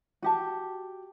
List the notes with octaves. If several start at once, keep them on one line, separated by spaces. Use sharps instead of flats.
F#4 G4 A5